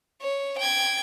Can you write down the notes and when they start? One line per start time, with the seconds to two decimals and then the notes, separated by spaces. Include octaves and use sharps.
0.22 C#5
0.58 G5 G#6